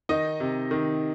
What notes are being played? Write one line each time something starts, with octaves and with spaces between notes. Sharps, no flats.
D#3 D#4 D#5
C3
D#3